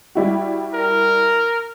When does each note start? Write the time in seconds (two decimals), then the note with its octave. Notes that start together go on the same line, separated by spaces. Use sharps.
0.15 G3 E4 F#4
0.74 A#4